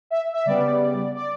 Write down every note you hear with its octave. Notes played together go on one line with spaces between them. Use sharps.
E5
E5
C#3 G3 B3 D5
D5